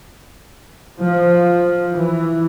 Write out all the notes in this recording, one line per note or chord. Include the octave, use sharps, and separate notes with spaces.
F3
E3